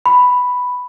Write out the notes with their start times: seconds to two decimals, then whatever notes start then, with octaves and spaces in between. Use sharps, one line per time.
0.06 B5